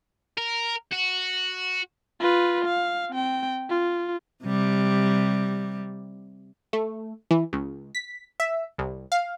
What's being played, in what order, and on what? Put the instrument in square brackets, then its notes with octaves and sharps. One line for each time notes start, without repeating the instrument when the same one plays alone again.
[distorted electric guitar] A#4
F#4
[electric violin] F4 B4
F5
C4 G5
F4
[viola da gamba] C3 G3
[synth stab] A3
E3
C#2
B6
E5
C2
F5